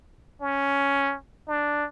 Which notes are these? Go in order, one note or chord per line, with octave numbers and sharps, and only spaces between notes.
C#4
D4